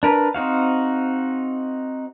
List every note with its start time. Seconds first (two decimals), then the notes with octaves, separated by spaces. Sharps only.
0.03 D4 A#4 B4
0.34 C4 D#4 F#4 F5